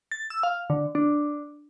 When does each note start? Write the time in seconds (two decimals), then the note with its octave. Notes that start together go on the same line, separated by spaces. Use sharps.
0.12 A6
0.30 E6
0.43 F5
0.70 D3
0.95 D4